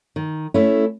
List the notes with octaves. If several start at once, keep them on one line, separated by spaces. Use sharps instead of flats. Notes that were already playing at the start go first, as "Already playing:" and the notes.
D#3
A3 C#4 E4